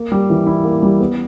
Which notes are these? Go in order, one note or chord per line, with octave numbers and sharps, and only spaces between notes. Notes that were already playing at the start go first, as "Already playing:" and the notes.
Already playing: A#3
G3
E3
E4
A#3
G3
B3